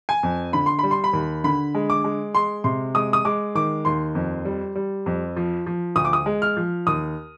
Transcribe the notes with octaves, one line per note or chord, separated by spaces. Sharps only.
G#5
F2
D3 B5
C6
G3 B5
C6
B5
D#2
D3 B5
G#3
D6
G#3
G#3 C6
C3 C6
G#3 D#6
D#6
G#3 D6
D#3 D6
D#2 C6
F2
G3
G3
F2
F3
F3
D2 D#6
D6
D#6
G#3
F6
F3
D#2 D#6